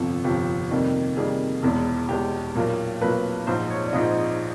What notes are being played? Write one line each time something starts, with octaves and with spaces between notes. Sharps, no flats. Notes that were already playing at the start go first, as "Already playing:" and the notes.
Already playing: G1 F2 C3 F3 A4
G1 F2 C3 F3 G4
F2 C3 D#3 G3 A#3
F2 C3 D#3 G3 A#3 G#4
E1 E2 B2 G#3
E1 E2 B2 G#3 G4
B1 A#2 F#3 A#3
B1 A#2 F#3 A#3 B4
A#1 G#2 F3 C5
C#5
D5
A#1 G#2 F3 D#5